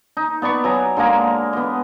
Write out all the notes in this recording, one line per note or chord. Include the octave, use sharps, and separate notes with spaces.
D#4
B3 D5 B5 C#6
F#3 G#5 A#5
D3 G#3 A#3 A#5
B3 D#5